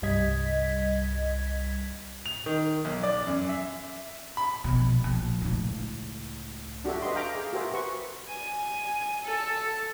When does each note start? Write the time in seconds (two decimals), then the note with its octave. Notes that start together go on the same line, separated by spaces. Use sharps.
0.02 C2 G2 G3 D#5 G#6 B6
2.26 F7
2.46 D#3
2.85 B1
3.03 D5
3.27 F#2
3.49 E5
4.37 B5
4.64 A#1 B2
5.04 A#1
5.42 C#2 A2
6.84 D4 F#4 G4 A4 E5
7.02 B4 D#5 B5 C6
7.15 F5 G5 A#5 D6
7.35 G#4
7.53 F#4 G4 A#4 C5 E5
7.74 B4 C#6
8.28 G#5
9.24 A4